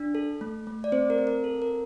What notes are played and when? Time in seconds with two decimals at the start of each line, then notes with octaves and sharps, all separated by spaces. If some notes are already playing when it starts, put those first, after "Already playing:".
Already playing: D4
0.15 A4
0.41 A3
0.67 A3
0.84 D5
0.92 C4 C5
1.10 A#4
1.18 C4
1.27 A#4
1.44 A4
1.62 A#4